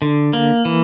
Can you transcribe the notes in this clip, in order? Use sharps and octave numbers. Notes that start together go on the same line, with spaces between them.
D3
A#3
E3